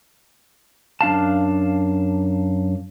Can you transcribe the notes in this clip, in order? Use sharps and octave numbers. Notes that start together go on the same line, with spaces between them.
F#2 D4 F5 A5